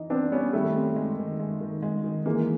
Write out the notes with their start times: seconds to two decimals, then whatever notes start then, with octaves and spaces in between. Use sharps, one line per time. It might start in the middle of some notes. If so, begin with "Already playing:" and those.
Already playing: E3 D#4
0.10 B3 C4 D4
0.32 G3 B3 C#4
0.53 D#3 G3 A3
0.74 C4
0.96 G#3
1.17 D#3
1.39 G#3
1.61 D#3
1.82 G#3
2.04 D#3
2.26 E3 G#3 A#3